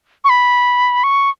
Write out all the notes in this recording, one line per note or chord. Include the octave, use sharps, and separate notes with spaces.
C#6
B5
C#6